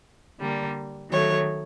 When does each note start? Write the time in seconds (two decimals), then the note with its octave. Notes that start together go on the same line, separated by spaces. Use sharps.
0.41 D3 G3 A#3
1.11 D#3 F#3 A3 C#5